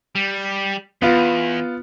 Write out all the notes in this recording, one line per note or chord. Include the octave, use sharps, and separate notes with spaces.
G3
E2 B3 F4